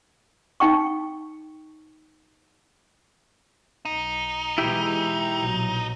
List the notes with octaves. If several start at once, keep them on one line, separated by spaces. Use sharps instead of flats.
D#4 G5 C#6
B1 D#4
B2 E3 G#3 E4 G4
A#1 B2 F#3